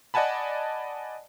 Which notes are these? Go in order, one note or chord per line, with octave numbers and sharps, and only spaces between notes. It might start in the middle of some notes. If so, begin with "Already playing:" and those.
D5 D#5 F#5 G#5 A5 B5